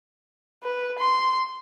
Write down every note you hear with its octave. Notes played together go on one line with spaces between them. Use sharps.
B4
C6